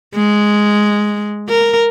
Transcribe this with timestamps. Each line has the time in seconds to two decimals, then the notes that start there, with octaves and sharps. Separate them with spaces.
0.16 G#3
1.49 A#4